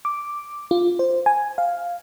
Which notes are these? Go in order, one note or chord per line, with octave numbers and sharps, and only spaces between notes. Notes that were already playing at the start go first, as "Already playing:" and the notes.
D6
F4
C5
G#5
F5